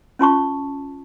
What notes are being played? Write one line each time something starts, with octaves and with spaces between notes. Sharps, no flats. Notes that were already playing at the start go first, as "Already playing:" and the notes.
C#4 F4 A5 C#6